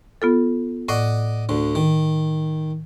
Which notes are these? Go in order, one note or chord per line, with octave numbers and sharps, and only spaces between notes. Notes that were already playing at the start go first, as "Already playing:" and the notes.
B3 F4 A4
A2 D5 D#5 F#5
D2 D3
D#3